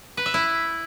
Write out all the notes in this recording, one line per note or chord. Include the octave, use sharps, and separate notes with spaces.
B4
E5
E4